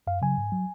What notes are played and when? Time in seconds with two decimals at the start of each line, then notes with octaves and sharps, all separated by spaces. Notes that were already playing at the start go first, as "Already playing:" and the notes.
0.07 F#2 F5
0.22 C#3 F#3 G#5
0.38 G#2
0.52 F#3